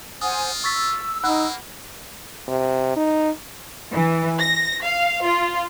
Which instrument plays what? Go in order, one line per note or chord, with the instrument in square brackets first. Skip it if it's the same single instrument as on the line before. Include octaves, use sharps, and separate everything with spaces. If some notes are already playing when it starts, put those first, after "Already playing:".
[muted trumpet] F4 [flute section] C5 F#5 G#5 [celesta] D#6
[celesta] C#6 A6 B6 [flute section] E6
[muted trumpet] A#3 [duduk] D#4 [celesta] F#5 B5 F#6
[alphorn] C3
D#4
[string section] E3
A#6
F5
F4